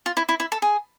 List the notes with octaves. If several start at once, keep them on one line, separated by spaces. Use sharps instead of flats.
F4
E4
E4
E4
A4
G#4